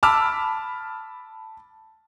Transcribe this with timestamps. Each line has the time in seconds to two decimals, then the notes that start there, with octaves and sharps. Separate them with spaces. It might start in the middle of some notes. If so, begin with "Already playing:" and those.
0.03 A5 B5 D6 E6 F6